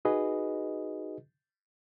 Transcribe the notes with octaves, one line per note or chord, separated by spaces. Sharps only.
D#4 F#4 G#4 B4 D#5